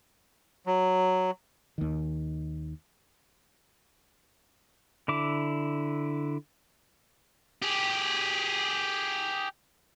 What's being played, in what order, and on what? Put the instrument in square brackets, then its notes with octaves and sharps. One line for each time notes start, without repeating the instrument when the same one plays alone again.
[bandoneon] F#3
[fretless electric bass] D#2 D#3
[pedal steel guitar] D3 E4 D6
[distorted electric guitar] G4 G#4